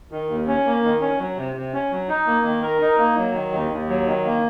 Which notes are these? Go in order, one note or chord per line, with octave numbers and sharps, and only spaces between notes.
D#3
D#2
C#4
A#3
D#3
C#4
F#3
C3
C3
C#4
F#3
D#4
A#3
D#3
A#4
D#4
A#3
F#3
D#3
D#2
D#2
F#3
D#3
A#3